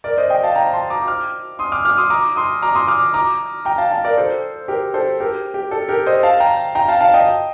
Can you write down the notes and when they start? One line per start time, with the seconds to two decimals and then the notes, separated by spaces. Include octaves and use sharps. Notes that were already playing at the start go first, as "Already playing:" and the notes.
0.04 A#4 D5
0.17 C5 D#5
0.30 D#5 G5
0.44 F5 A5
0.56 G5 A#5
0.73 A5 C6
0.90 A#5 D6
1.07 D6 F6
1.59 C6 D#6
1.72 D6 F6
1.85 D6 F6
1.97 C6 D#6
2.10 A#5 D6
2.36 C6 D#6
2.62 A#5 D6
2.75 C6 D#6
2.87 D6 F6
3.14 A#5 D6
3.65 G5 A#5
3.78 F5 A5
3.91 F5 A5
4.04 A#4 D5
4.17 A4 C5
4.68 G4 A#4
4.94 A4 C5
5.20 G4 A#4
5.54 G4
5.71 A4
5.88 G4 A#4
6.06 C5 D#5
6.23 F5 A5
6.40 G5 A#5
6.75 G5 A#5
6.88 F5 A5
7.01 F5 A5
7.14 D#5 G5